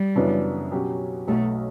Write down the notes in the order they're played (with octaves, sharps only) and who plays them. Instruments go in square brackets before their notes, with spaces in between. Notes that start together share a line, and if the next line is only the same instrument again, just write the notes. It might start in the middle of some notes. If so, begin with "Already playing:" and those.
Already playing: [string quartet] G3
[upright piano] F#2 C#3 E3 B3 D4
B2 F#3 C#4 G4
[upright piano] B1 B2 F#3 [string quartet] A3